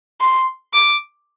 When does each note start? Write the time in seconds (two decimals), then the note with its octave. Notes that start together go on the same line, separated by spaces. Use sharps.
0.21 C6
0.74 D6